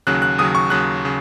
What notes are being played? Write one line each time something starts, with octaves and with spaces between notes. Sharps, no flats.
D#2 C#3 F#3 F#6
F#6
D#2 C#3 F#3 D#6
C#6
D#2 C#3 F#3 F#6
C#3